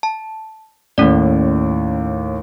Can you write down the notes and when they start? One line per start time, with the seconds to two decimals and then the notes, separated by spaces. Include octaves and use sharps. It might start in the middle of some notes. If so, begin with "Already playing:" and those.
0.03 A5
0.98 D#2 A2 C#4 D5